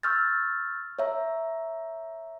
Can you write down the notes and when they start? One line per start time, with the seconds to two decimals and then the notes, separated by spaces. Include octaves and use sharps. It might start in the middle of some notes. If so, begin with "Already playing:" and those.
0.03 C#6 E6 F6 G6 A6
0.99 C#5 E5 A#5